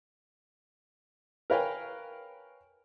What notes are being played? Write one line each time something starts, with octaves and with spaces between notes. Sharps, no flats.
A#4 B4 C#5 F5 G5 G#5